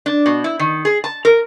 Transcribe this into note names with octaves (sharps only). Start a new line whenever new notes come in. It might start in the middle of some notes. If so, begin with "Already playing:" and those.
D4
B2
E4
D#3
G#4
A5
A#4